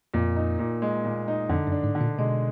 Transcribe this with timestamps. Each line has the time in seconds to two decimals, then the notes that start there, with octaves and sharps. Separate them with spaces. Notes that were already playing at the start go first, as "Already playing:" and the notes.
0.14 F2 A#2
0.36 D#4
0.59 A#2
0.82 G#3
1.05 A#2
1.28 D#4
1.49 F2 D3
1.67 F#2
1.72 D4
1.84 G#2
1.95 D3
2.01 A#2
2.18 B2 G#3